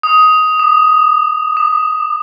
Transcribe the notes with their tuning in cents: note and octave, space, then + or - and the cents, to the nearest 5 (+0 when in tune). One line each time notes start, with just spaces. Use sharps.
D#6 +10
D#6 -45
D6 +40